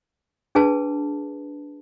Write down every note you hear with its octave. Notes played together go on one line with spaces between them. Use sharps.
D4 G#4 B4 A5